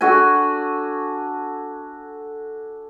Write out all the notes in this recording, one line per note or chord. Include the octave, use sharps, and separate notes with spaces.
D4 F#4 A4 G#5